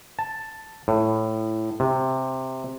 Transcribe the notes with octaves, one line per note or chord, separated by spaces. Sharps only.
A5
A2
C3